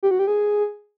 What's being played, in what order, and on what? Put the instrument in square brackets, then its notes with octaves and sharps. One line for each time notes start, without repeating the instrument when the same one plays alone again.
[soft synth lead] G4
F#4
G4
G#4